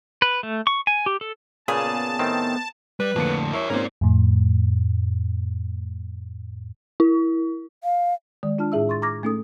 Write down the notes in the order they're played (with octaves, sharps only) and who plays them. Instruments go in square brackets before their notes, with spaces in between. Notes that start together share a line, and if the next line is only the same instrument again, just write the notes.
[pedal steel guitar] B4
A3
C#6
G#5
G4
A4
[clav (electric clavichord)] A#2 C#3 [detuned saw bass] B3 [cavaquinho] G#4 [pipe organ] A5
[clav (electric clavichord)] A2 D#3 C4
[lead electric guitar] G3 [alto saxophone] B4
[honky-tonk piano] F2 A#3 C#7 [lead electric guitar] A2 D3
[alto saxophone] E4 [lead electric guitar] A#4 C#5
[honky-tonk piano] G#2 A#3 C4 [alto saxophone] C#4 [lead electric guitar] A#4 D5
[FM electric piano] F2 A2
[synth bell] E4
[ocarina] F5
[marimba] D#3 G#3 D5
D4 F4 A5 F6
A2 E4 G#4 E5 E6
C6 C#6 A6
A#5 C#6 D6 F6 G#6 A#6
A3 C#4 D#4 A4 D#6